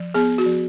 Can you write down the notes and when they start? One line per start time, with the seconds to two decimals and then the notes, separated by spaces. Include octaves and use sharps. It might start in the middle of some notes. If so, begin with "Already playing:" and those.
Already playing: F3
0.14 B3 G#4
0.38 F#4
0.46 F3